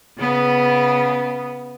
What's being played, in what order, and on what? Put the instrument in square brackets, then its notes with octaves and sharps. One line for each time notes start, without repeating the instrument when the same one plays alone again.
[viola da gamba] C#3 B3